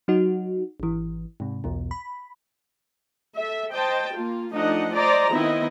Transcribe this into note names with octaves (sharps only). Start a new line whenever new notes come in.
F#3 D#4 F#4
G#1 E3
G#2 C3
B1 E2 B2
B5
A4 E5
C5 D#5 G5 A5
A#3 F4
F3 A3 D4 D#4 D#5 F#5
C5 D5 D#5 A#5
D#3 B3 C4 E4 D#5